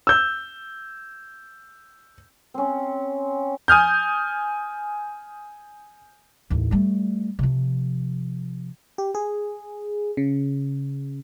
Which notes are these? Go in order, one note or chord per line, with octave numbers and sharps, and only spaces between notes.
E6 G6
C4 C#4
G#5 D#6 F6 G6
A1 D#2
G3 A3
C3 F3
G4
G#4
C#3